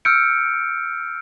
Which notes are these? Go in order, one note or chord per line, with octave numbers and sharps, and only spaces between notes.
E6 F6 G6 C#7 D7